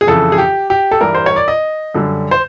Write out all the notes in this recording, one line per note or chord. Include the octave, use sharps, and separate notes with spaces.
G#4
F2 C#3 E3 A4
G#4
G4
G4
A4
G2 E3 G3 A#4
C5
C#5
D5
D#5
F#2 D3 G3
C5